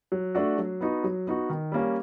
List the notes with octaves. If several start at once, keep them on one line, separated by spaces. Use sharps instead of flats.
F#3
A3 D4 F#4
F#3
B3 D#4 F#4
F#3
B3 D#4 F#4
D#3
G3 A#3 C#4